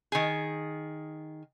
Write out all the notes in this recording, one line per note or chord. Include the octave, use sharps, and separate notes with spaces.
D#3 G#4